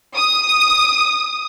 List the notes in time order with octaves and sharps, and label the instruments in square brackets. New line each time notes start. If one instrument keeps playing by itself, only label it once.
[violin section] D#6